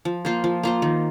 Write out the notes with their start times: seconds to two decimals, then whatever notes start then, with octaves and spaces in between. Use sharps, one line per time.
0.05 F3
0.25 A#3 F4 C5
0.44 F3
0.63 A#3 F4 C5
0.82 D#3